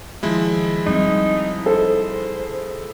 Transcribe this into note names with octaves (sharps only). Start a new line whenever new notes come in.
D#3 F3 G#3 E4
G3 C4 D#4
A4 C5